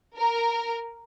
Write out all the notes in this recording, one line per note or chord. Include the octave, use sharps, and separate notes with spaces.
A#4